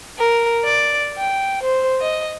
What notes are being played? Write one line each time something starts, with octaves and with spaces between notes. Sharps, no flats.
A#4
D5
G5
C5
D#5